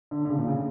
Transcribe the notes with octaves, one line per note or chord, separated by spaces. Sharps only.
D3
D3
C#3
A#2
C#3